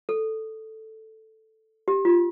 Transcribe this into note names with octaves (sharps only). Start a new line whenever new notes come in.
A4
G4
F4